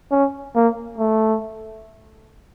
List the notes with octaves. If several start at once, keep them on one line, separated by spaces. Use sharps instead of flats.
C#4
A#3
A3